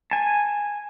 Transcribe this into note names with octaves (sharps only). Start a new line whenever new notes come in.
G#5 A5